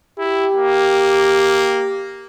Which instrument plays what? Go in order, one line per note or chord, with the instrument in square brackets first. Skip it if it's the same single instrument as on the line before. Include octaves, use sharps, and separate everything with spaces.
[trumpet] E4 [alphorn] G4
[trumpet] A#3